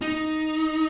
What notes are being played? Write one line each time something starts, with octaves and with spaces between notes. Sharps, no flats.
D#4